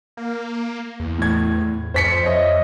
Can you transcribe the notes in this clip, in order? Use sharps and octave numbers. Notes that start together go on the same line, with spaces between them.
A#3
E2
A2 G#6
F2 C5 B6 C#7
C#5 D#5 E5